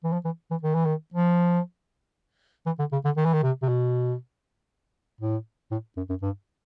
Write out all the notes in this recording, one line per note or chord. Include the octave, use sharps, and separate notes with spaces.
E3
F3
E3
E3
D#3
E3
D#3
F3
E3
D3
C#3
D3
D#3
E3
D#3
C3
C3
B2
A2
A2
F#2
F#2
G2